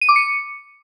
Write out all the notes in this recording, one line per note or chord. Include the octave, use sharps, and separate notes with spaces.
D#7
D6
C#7